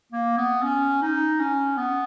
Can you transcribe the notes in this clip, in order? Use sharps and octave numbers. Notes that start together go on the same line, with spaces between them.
A#3
B3
C#4
D#4
C#4
B3